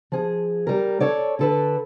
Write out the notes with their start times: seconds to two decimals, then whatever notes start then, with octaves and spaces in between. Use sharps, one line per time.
0.12 F3 G#4
0.67 G3 A#4
1.00 A4 C#5 D5
1.39 D3 A4 B4